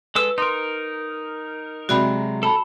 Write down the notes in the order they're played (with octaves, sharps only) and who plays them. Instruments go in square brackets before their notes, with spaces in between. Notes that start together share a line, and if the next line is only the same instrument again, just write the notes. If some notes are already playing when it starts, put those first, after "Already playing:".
[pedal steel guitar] G#3 A4 E6 [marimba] B4
[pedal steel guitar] D#4 A#4 [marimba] C6
[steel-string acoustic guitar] C3 F#3 G#3 [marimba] F#4 D5 B5
[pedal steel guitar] A4 [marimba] A5 B5